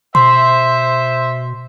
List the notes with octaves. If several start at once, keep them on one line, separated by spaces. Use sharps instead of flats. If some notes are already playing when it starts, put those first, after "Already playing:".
B2 C5 E5 C6